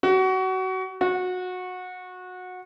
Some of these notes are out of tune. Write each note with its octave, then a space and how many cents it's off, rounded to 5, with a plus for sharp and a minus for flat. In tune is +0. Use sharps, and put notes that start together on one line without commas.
F#4 +25
F#4 -20